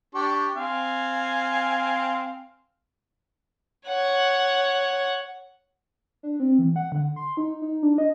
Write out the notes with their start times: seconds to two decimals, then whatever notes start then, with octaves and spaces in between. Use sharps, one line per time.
0.15 D4 G4 C#6
0.56 C4 F5 G#5
3.87 C#5 F#5
6.23 D4
6.40 C4
6.59 E3
6.76 F#5
6.92 D3
7.16 C6
7.37 D#4
7.62 D#4
7.83 D4
7.98 D#5